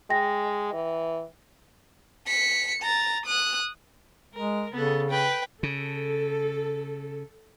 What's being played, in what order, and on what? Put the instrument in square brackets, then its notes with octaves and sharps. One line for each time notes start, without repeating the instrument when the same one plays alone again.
[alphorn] G#3 [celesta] G5 A#6
[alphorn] E3
[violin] B6 C#7
A#5 A6
D#6 F#6
[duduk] G#3 [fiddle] A#4
[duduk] C#3 [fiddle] B3 A4
[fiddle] B4 G5
[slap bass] C#3 [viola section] A4